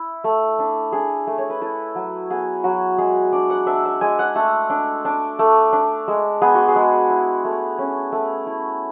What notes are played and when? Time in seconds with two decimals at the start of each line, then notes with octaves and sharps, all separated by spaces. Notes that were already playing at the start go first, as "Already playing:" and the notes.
Already playing: E4
0.24 A3
0.59 D4
0.92 D4 G#4
1.27 A3
1.38 C#5
1.50 B4
1.61 E4 A4
1.95 F#3
2.30 B3 G#4
2.64 F#3 F#4
2.98 G#3 G#4
3.33 D4 D5
3.50 F#5
3.67 D4 E5
3.85 E5
4.01 G#3 G#5
4.19 F#5
4.36 A3 A4
4.70 D4
5.05 D4
5.39 A3
5.73 D4
6.08 G#3
6.42 B3 G#4
6.55 F#4
6.68 G#4
6.76 G#3
7.10 E4
7.45 A3
7.79 C#4
8.12 A3
8.47 E4